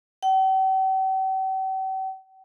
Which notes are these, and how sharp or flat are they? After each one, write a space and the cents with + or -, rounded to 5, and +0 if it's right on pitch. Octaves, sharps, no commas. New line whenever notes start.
G5 -45